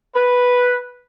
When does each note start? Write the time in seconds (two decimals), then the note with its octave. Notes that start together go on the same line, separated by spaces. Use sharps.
0.15 B4